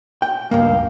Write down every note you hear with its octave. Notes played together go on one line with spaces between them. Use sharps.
G5
C#2 G2 A#3 F5